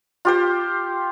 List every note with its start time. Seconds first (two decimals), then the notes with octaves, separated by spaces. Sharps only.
0.25 F4 G4 C5